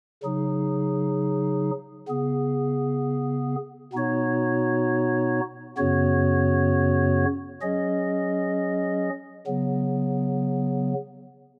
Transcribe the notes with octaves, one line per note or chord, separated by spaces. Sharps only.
C#3 F#3 D#4 G#4
C#3 B3 G#4
B2 B3 D#4 F#4 C#5
F#2 C#3 B3 F#4 C#5
F#3 C#4 G#4 D#5
C#3 F#3 B3